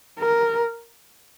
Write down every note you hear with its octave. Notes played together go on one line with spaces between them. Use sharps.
A#4